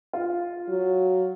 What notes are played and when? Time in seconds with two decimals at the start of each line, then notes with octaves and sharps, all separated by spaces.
0.13 F4
0.69 F#3